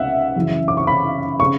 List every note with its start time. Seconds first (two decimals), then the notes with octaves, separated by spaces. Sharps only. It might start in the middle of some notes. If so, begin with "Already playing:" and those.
Already playing: C#2 E5 F#5
0.36 F#2 C#3 E3
0.68 D6
0.77 C#6
0.87 B5
1.40 C#3 C#6